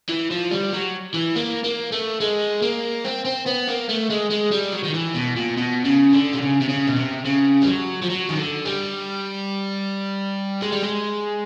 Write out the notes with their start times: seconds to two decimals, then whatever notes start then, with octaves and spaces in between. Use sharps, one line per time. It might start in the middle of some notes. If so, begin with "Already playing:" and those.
0.09 E3
0.31 F3
0.51 G3
0.73 F#3
1.14 E3
1.36 A#3
1.64 A#3
1.92 A3
2.20 G#3
2.62 A#3
3.05 C4
3.25 C4
3.46 B3
3.68 A#3
3.89 A3
4.10 G#3
4.30 G#3
4.51 G3
4.72 F#3
4.83 D#3
4.94 E3
5.14 B2
5.36 A#2
5.57 B2
5.85 C#3
6.13 D3
6.33 C3
6.41 C#3
6.61 C3
6.69 C#3
6.87 B2
6.96 C3
7.25 C#3
7.62 G3
7.67 F#3
8.02 F3
8.10 F#3
8.29 D#3
8.37 D3
8.65 G3
10.62 G#3
10.72 G3
10.83 G#3